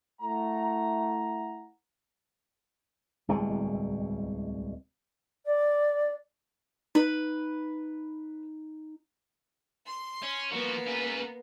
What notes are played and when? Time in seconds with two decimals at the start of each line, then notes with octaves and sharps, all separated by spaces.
0.21 A3 E4 F#5 A#5
3.28 D1 C2 B2 G#3
5.45 D5
6.95 D#4 B4
9.86 C6
10.23 C#4
10.52 F3 A#3 B3 F#4
10.86 C#3 B4